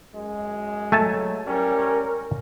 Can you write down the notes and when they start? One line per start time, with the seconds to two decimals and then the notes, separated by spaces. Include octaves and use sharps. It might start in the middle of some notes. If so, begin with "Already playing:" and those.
0.15 F#2 G#3
0.92 F#3 A3 G#5 A5
1.46 A2 G3 C#4 A#4